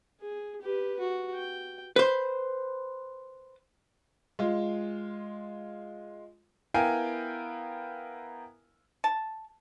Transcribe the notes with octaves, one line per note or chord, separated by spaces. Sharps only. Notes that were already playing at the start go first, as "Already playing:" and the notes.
G#4
G4 B4
F#4
G5
B4 C5
G#3 F4
B3 E4 A#4 F5 G5 G#5
A5